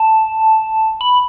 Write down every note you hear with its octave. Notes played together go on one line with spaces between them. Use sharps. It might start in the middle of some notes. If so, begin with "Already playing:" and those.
Already playing: A5
B5